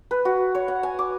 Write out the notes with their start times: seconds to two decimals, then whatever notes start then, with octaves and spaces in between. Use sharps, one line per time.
0.11 B4
0.25 F#4
0.55 C#5
0.68 F#5
0.83 G#5
0.99 D6